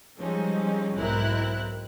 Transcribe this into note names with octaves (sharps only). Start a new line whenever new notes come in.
F3 G3 G#3 C4 C#4 D#4
B1 G#2 C4 E4 A#4 F#6